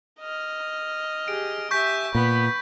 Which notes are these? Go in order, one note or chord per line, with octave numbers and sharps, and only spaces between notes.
D#5 F6
G4 G#4 D7
G4 E5 G#5 C#6 G6 B6
A#2 B3 B5